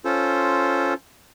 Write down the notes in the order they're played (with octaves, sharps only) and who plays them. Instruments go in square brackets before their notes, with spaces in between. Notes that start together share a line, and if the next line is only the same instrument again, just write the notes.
[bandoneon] C#4 F4 A4 C5